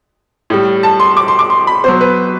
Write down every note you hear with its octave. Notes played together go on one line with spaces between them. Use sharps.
A2 G3
A5
C6
D6
C6
D6
C6
B5
B2 F#3 C5
B4